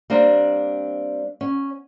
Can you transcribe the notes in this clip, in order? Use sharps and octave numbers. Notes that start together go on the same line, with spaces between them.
G3 A#3 C4 D4
C#4